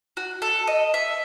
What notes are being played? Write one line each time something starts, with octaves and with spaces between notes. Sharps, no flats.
F#4
A4
D#5
E5